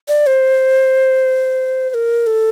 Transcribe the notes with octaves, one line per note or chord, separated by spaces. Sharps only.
D5
C5
C5
A#4
A4